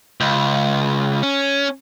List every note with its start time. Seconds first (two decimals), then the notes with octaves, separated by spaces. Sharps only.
0.20 C#2
1.23 C#4